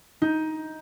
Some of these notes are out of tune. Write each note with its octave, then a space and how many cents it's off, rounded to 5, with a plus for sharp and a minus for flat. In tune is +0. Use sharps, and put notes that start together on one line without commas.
D#4 +15